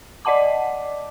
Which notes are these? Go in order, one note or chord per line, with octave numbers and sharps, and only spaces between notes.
D5 D#5 F#5 A5 D6